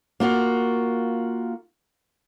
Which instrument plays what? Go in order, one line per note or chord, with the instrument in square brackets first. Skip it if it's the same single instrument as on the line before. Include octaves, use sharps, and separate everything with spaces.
[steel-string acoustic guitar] A#3 F4 F#4